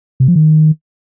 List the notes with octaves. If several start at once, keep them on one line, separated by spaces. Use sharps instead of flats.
C3
F3
D#3